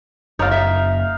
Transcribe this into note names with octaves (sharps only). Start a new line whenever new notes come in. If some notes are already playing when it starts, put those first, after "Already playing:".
F#1 D#4 C#5 D5 F5
E5